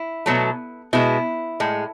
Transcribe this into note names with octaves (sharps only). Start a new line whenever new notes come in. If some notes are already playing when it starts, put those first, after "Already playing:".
Already playing: E4
B2 F#3 A3
B2 G#3 E4
A2 G#3